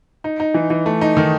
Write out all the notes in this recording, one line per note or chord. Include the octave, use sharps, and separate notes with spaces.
D#4
D#4
E3
E3
A3
D#4
D#3